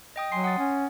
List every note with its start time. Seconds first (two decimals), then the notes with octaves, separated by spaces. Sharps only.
0.16 D#5 G5 D#6
0.32 F#3 G#5 C6 C7
0.44 F#5 D#6 A6
0.58 C#4